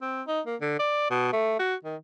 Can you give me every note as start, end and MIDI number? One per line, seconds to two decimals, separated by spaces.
0.02 0.22 60
0.27 0.41 63
0.47 0.56 58
0.61 0.78 50
0.79 1.06 74
1.11 1.32 47
1.33 1.56 57
1.59 1.75 66
1.84 1.96 51